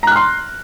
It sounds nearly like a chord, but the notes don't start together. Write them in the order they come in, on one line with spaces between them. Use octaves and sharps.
A#5 F#6 F6 C6